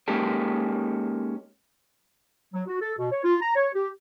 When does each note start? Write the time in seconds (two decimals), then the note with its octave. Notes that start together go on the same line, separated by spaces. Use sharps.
0.08 G#3 A#3 C#4 D#4 G4 A4
2.54 F#3
2.67 F#4
2.81 A4
2.98 B2
3.12 C#5
3.24 F4
3.42 A#5
3.55 C#5
3.74 G4